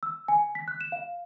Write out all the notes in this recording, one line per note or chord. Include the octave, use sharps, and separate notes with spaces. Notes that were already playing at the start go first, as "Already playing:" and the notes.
E6
G#5
B6
F#6
E7
F5